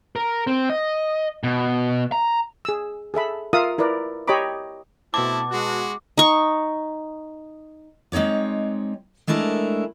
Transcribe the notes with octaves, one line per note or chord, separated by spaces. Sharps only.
A#4
C4
D#5
B2
A#5
G#4 E6
G#4 A4 E5 B5
F4 A#4 E5 F5 D#6
E4 A#4 B4 D5
G4 C#5 D#5 A#5 B5 D6
B2 A3 C4 E4 A5 D6
G#3 F#4
D#4 C#6
G#3 C4 D#4 C#5 D5
G#3 A3 D4 E4 A#4